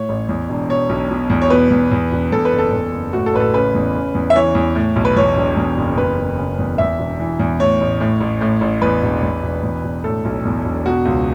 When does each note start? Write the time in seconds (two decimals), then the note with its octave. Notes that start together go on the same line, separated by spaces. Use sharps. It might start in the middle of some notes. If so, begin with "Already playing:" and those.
Already playing: A2 C#5
0.09 A1
0.29 E2
0.49 E1
0.69 B2 C#5
0.89 B1
1.10 B2
1.30 E2
1.42 C#5
1.50 B2 B4
1.70 E2
1.92 E2
2.12 E1
2.32 E2 A4
2.45 B4
2.52 F#1
2.58 A4
2.73 E2
2.92 F#1
3.13 A2 F#4
3.26 A4
3.34 A1 B4
3.40 A4
3.53 C#3 B4
3.75 E2
3.95 C#3
4.15 E2
4.30 E5
4.36 E3 C#5
4.55 E2
4.75 A2
4.96 B1
5.05 B4
5.16 E2 C#5
5.36 E1
5.57 E2
5.77 F#1
5.98 E2 B4
6.18 F#1
6.38 C#3
6.59 E2
6.78 E2 E5
6.99 E1
7.20 E3
7.39 E2
7.60 A2 C#5
7.81 A1
8.00 A2
8.21 A1
8.41 A2
8.61 A1
8.82 E2 B4
9.03 E1
9.23 E2
9.43 E1
9.63 E2
9.84 E1
10.04 A2 A4
10.25 B1
10.45 E2
10.65 E1
10.86 B2 F#4
11.05 C#2